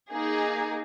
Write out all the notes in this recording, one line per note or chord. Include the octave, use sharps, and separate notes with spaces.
A#3 D#4 G#4